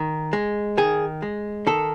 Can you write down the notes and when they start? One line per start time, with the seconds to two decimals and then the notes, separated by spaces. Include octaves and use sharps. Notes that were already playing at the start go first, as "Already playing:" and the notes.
Already playing: D#3
0.33 G#3
0.77 D#3 G#4
1.22 G#3
1.67 D#3 A4